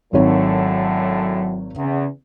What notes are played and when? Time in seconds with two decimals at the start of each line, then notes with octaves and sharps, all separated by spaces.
0.13 G#1 F#2 A2 D3 D#3 F#3 C#5
1.77 E2 C#3